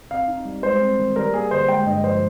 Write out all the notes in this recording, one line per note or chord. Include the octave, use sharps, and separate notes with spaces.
C4 F5
D#4
G3
G#3 C5
C4
D#3
G3 A#4
A#3 G#4
D3 C5
G#3 G5
G2 D#5
F3 C5